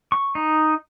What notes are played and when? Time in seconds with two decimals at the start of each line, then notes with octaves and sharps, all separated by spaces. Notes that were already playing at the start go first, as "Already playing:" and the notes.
0.12 C#6
0.35 D#4